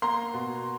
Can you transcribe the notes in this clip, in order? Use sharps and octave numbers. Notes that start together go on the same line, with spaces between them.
A#3 A#5 C6
B2